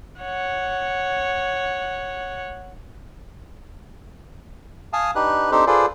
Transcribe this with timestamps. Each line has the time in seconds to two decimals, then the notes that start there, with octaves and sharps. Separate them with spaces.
0.22 C#5 F#5
4.93 F5 G#5 A5 D#6
5.15 D4 D#4 G4 B4 F#6
5.51 C4 D4 D#4 G4 A4 C5
5.67 F4 G#4 A4 B4 C5 D5